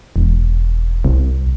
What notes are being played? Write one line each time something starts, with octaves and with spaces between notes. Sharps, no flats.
E1
C2